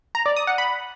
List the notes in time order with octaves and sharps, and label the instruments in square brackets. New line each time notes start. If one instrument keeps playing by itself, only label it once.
[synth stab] A#5
D5
D#6
F#5
B5